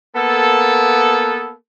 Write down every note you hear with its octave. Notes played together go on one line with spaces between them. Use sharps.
A#3 B3 A4